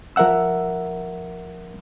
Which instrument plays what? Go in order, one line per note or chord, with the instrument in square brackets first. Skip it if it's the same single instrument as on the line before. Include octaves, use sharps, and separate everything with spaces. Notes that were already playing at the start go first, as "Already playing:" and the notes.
[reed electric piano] F3 A#4 E5 F#5 E6